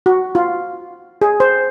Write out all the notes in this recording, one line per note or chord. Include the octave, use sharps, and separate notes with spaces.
F#4
F4
G#4
C5